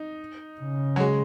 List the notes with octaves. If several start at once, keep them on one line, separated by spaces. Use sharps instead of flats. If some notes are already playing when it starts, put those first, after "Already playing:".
Already playing: D#4
C#3
F#3
G#3